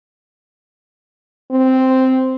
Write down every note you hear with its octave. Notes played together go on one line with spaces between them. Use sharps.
C4